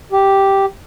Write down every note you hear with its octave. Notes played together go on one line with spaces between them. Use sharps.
G4